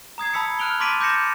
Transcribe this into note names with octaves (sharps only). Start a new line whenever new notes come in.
A#5 D#6 G#6 C7
A5 B5 E6 B6 C#7
A5 F6 F#6 D7 F7 G7
C6 D6 A6 B6 D7 D#7
D6 G6 A6 A#6 C#7 E7